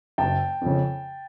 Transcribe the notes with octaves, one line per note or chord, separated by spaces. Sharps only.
F#1 G5 A5
F2 C#3